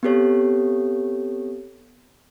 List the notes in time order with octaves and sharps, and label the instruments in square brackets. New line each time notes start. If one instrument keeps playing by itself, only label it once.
[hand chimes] B3 C4 G4 A4 C#5